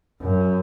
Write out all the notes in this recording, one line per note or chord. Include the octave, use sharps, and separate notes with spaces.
F#2